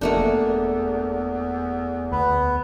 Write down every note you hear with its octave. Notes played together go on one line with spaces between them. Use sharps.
F1 E2 A3 A#3 D4
D2 B3 B4